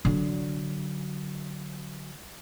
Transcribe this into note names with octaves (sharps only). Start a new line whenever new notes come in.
D3 F#3